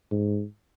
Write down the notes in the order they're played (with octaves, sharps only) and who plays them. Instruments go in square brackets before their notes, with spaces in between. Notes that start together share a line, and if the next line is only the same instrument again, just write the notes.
[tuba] G#2